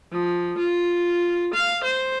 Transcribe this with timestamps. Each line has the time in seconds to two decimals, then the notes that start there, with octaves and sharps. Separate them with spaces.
0.12 F3
0.58 F4
1.54 F5
1.84 C5